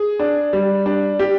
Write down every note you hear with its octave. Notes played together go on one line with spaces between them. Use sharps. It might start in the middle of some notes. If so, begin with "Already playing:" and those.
Already playing: G#4
D4
G3
D4
G4